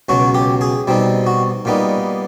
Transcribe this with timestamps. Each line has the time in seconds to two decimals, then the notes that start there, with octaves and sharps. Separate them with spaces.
0.09 C#2 B2 F#3 F#4
0.35 G4
0.61 G#4
0.87 B2 G3 C4 D#4
1.27 F#4
1.65 A#2 G3 B3 D#4